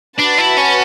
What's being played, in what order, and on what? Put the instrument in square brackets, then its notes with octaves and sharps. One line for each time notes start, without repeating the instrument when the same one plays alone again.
[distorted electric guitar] D4 [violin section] F#4 B4 F#5 A5
[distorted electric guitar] E4
C#4